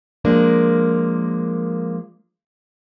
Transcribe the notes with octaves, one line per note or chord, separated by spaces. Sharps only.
F3 G#3 A#3 D4 A#4